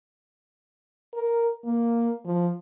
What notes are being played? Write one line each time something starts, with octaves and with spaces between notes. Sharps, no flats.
A#4
A#3
F3